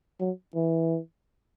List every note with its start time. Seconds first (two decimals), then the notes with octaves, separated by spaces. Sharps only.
0.20 F#3
0.56 E3